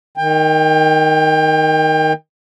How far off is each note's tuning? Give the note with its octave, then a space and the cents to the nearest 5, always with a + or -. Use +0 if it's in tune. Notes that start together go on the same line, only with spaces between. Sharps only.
D#3 +0 G5 +30